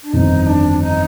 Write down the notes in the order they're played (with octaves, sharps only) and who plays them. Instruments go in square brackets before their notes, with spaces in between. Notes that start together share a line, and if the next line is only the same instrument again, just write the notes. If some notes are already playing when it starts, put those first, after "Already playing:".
[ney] D4
[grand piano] G1 F2 D#3 [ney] D#4
[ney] D4
D#4